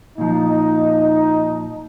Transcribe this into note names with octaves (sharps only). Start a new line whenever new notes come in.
A#2 F3 D#4